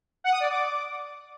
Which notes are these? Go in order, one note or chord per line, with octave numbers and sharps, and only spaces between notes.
F#5
D#6
D5
D6